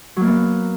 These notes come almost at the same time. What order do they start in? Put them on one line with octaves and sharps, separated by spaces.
F#3 A#3 B3